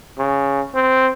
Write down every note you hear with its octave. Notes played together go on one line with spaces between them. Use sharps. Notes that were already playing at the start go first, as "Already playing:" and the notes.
C#3
C4